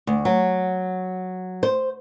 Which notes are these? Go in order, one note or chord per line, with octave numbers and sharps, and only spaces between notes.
D2
F#3
C5